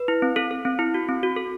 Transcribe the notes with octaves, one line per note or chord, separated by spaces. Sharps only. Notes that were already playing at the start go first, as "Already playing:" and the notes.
Already playing: B4
E4
C4
C4 A4
A4
C4
E4
F#4
C4
F#4
A4